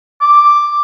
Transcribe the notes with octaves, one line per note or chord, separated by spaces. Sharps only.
D6